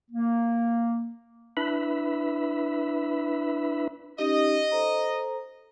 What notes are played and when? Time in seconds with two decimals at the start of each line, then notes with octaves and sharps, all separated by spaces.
0.11 A#3
1.57 D4 E4 B4 E5 B5
4.19 C#4 D#4 G4 D#5
4.72 A4 C5 A#5